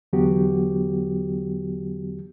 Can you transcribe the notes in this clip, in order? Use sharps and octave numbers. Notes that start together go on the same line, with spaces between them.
E2 D3 F#3 B3 F#4 G4